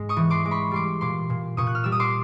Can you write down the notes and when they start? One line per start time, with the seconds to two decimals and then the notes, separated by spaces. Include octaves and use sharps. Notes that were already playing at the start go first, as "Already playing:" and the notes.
Already playing: G#2 G#3
0.09 C#6 D#6
0.17 E3
0.30 C6 D6
0.45 G#3 D6
0.51 B5 C#6
0.71 G3 C6 D6
1.01 A#2 C6 D6
1.30 A#2
1.57 A#2 C#6 D#6
1.67 F#6
1.75 F6
1.84 G3 E6
1.92 D#6
2.00 C6 D6